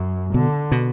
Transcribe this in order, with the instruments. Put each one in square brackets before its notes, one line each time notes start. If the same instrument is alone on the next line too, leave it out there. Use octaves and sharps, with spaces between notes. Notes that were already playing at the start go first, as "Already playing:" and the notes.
Already playing: [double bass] F#2
[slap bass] B2 [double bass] D3
[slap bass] B2